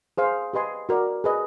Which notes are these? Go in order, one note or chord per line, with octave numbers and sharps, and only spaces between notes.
G#4 C5 F5
G4 B4 D#5 G#5 C6
F#4 A#4 D5
G#4 B4 D#5